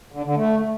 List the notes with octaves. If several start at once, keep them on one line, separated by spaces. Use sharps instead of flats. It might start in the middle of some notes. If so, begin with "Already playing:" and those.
D3
D3
A3